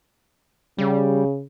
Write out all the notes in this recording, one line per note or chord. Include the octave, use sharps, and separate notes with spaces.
C#3 G3